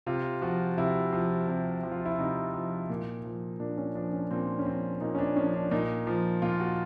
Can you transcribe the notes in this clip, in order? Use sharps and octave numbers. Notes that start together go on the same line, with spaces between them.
C3 F4
F3 F#4
C3 E4
F3
C3
F3
F4
E4
C3 D#4
F3
A#2
F3
A#2 D4
C#4
F3 D4
C#4
A#2 C4
C#4
F3 C4
A#2 D#4
C#4
D4
F3 C#4
D4
A#2 D#4
F3
A#2 F4
F#4